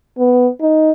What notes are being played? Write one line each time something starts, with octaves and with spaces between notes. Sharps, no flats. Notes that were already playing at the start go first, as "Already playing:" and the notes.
B3
D#4